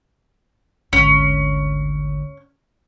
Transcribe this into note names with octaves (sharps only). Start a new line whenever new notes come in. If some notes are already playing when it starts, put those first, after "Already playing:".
G#1 D2 C#4